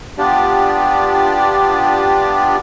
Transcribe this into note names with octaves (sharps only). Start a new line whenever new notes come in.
B3 D4 F4 G4 D5